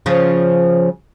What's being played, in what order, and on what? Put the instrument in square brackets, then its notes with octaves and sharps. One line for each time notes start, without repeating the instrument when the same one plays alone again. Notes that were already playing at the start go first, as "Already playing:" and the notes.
[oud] C#3 F3 C#4